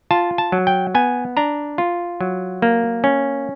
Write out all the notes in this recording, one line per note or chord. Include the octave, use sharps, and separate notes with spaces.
F4 A5
A5
F#3
G5
B3 G#5
D4 A#5
F4
F#3
A#3
C#4